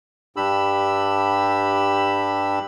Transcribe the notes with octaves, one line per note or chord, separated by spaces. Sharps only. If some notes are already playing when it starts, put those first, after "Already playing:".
G2 D4 G4 B5 E6